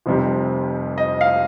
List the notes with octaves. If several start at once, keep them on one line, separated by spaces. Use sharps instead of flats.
F1 F2 C3 G3
D#5
F5